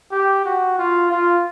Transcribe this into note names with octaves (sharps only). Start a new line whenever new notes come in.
G4
F#4
F4
F4